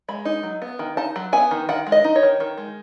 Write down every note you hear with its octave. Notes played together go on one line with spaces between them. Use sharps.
G#3 B5
D#4
F#3
B3
D#3
D#4 A5
F#3
B3 G#5
D#3
D#3 F#5
G#3
D#5
D#4
C#5
D#3
D#3
G#3